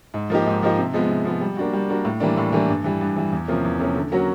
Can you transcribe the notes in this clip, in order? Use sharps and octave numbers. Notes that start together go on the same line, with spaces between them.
G#2
F3 A#3 D#4 G4
G#2
F3 A#3 D#4 G4
C3
F3 G#3 B3
C3
F3 G#3 B3
G3
A#3 D4 F#4
G3
A#3 D4 F#4
A2
E3 G3 A#3 D4
A2
E3 G3 A#3 D4
G2
E3 G3
G2
E3 G3
E2
C3 F3 A#3 C#4
E2
C3 F3 A#3 C#4
D3
F#3 A#3 C#4 F#4